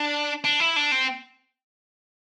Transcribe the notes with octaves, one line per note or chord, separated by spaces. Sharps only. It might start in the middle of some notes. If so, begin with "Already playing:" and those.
Already playing: D4
D4
E4
D4
C4